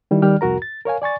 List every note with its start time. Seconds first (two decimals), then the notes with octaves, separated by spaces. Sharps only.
0.11 D#3 G3 E4
0.22 D#3 G3 D5 G5 F6
0.41 C2 F2 F#4 A#4 A#5
0.62 A6
0.85 A#4 C#5 F5 G#5
1.02 D5 G#5 C#6 A6